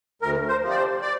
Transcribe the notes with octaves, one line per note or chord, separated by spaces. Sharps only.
D2 A#4
C5
C3 F3
D5
C5
D5